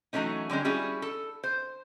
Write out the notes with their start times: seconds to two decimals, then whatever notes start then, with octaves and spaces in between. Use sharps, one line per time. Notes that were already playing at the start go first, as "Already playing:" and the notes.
0.13 E3 F#3 A3 C#4 D#4
0.50 D3 G3 G#3 C#4
0.65 G3 C#4 E4 F#4 G#4
1.02 A4
1.44 C5